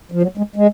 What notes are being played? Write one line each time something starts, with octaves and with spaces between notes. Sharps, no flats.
F3
F#3
G#3
G#3